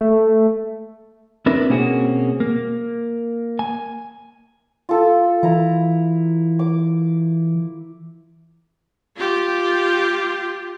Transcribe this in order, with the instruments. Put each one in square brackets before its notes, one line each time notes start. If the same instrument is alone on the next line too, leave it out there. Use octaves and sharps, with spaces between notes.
[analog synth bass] A3
[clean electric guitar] C4 D4 E4 A#4 B4
B2 A#3 C4 C#4 F#4 G#4
A#3
G#5
[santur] F4 A4
[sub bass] E3 [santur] E4 A#5
[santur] D6
[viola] F4 G4